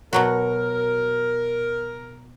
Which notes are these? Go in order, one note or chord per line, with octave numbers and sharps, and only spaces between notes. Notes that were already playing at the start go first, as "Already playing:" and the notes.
B2 F#3 F#4 A#4